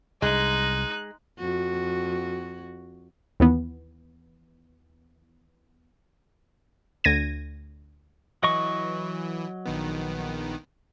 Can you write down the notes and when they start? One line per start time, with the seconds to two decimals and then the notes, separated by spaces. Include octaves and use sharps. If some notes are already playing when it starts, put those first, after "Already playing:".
0.22 C2 G#3 D#4 F#6
1.39 F2 F#4
3.40 D#2 E3 B3
7.04 D2 G#6 A#6 D#7
8.43 E3 F#3 D#5 C#6
9.66 A#1 D#3 B3